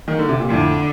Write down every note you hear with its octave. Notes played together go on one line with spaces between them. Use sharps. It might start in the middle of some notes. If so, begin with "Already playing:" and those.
D#3
D3
C3
A#2
F2 A2 D3